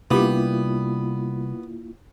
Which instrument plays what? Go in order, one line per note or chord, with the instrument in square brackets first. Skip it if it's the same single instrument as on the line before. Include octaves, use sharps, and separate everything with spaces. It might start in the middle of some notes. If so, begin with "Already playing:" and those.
[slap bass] C3 G3 [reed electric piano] A#3 E4 F4 [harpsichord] B3 [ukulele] D4 G4